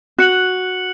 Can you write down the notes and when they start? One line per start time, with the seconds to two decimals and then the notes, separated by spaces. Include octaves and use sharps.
0.18 F#4 F#6 C#7 F#7